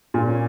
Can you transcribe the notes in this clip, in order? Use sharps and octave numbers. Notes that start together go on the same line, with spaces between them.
A#2
C#4